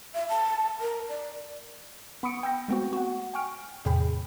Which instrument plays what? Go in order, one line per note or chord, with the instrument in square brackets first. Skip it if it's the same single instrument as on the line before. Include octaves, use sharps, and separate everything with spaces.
[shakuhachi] E5
A5
A#4
D5
[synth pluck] B3 B5 C#6 D#6 C#7 D7
G5 E6 G6 A#6
G#3 A3 B3 C4 F#4
F#4 F#5
G5 G#5 C#6 F6 D7
E2 A2 C3 G#4 G5 B5